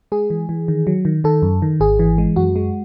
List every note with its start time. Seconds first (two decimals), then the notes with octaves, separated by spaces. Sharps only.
0.12 G#3 G#4
0.30 E3
0.49 E3
0.68 D#3
0.87 F#3
1.05 D#3
1.24 D#3 A4
1.42 F#2
1.62 D#3
1.80 G#1 G#4
1.99 E3
2.18 G#3
2.36 F#2 F#4
2.56 G#3